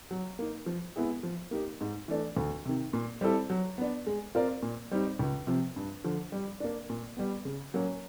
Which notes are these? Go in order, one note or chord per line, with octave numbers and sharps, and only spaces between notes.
F#3
A#3 D#4
F3
G#3 B3 E4 G#4
F3
A#3 D#4 G4
G#2
E3 A3 D4
D2
C3 D#3
A#2
G3 C4 E4 A4
F#3
B3 D4
G#3
C4 F4 A#4 D5
A#2
G3 C4 D#4
C#2
C3 F3
G2
D3 F3
G3
A#3 D4
A#2
G3 B3
C#3
F#3 A#3 C#4